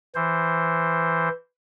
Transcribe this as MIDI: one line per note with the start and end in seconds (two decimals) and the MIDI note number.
0.15 1.29 52
0.15 1.29 72